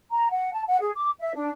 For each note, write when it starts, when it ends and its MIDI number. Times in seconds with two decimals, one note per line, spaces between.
0.12 0.28 82
0.30 0.50 78
0.52 0.62 81
0.67 0.76 78
0.80 0.91 68
0.95 1.10 86
1.19 1.33 76
1.35 1.49 62